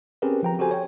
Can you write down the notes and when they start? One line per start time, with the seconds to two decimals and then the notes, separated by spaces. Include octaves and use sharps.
0.22 C4 C#4 G4 G#4 A#4 B4
0.43 F3 G5 A#5
0.59 F#4 G4 A4 C5 G#5
0.71 C#5 G5